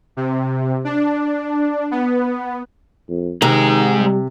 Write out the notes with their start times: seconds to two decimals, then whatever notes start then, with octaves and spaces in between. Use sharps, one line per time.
0.17 C3
0.85 D4
1.91 B3
3.09 F2
3.42 C3 D#3 G#3 A#5
3.99 G3